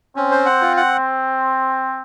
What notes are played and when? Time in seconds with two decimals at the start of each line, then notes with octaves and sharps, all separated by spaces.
0.16 C4 C#4
0.31 C5
0.46 F#5
0.61 F4
0.77 F#5